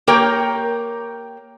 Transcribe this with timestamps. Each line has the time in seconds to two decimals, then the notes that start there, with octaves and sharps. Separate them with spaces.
0.07 A#3 G4 A#4 C#5 G5